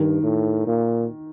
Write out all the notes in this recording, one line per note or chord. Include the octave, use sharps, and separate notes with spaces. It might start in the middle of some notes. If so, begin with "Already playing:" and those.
Already playing: G2 D#3
A2
A#2